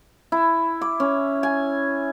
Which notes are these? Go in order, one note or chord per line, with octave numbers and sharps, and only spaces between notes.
E4
D6
C#4
G#5